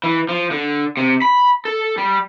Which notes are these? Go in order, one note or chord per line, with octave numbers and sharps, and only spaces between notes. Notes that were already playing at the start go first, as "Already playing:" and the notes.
E3
F3
D3
C3
B5
A4
G3